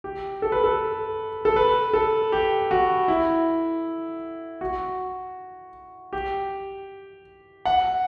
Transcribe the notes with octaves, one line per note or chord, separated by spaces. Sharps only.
G4
A4
B4
A4
A4
B4
A4
G4
F#4
E4
F#4
G4
F#5